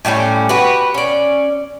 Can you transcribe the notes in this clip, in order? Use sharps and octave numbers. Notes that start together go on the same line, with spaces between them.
A2 G3 B3 C#4
F#4 G4 B4
C#4 D5